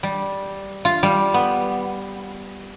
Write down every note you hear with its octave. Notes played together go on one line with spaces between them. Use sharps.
G3
F4
G3
B3